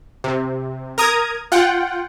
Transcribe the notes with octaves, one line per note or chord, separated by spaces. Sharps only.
C3
A#4 A#5 D#6 G#6
F4 F#5 G5